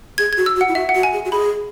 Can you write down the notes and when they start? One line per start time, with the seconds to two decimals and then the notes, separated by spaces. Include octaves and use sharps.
0.18 G#4 G#6
0.33 F#4 G#6
0.46 E6
0.56 F#4
0.61 F#5
0.68 E4
0.75 F#4 E5
0.89 F#5
0.95 F#4
1.03 G#5
1.13 G#4
1.25 F#4
1.31 G#4 B5